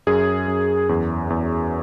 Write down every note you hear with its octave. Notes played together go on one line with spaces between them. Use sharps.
F#2 G#4
F#2
E2
E2